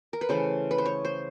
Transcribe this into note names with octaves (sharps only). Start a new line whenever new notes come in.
A#4
B4
C#3 E3 A3 C5
B4
C5
C#5
C5